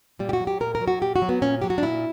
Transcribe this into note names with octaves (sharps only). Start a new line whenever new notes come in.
A#2 G3
G4
F#4
F#3
G4
A#2 A#4
A#4
F#3
F#4
A#2 G4
F#4
F#3
B3
A#2 C#4
F#3 G4
F#4
D4
A#2 E4